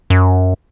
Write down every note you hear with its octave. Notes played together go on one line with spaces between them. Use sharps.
F#2